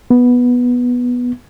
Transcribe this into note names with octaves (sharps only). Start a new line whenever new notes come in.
B3